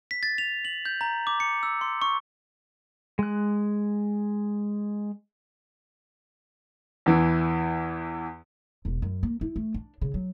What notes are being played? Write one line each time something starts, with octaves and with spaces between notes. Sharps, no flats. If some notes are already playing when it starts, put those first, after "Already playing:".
B6
A6
F7
F#7
G6
A#5
D6
C#7
E6
C6
C#6
G#3 F#6
E2 E3
E1
F#2
A#3
E4
A3
D4
C#3
F#3